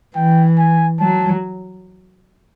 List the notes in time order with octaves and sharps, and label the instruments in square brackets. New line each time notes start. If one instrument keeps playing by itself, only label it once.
[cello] E3 [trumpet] G5
[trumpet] G#5
[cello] F#3 [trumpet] A5